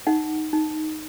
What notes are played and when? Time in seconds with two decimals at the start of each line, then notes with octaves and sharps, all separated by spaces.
0.07 D#4 F#5
0.53 D#4